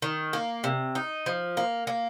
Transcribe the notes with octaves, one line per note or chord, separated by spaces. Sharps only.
D#3
A#3
C3
D#4
F3
A#3
A#3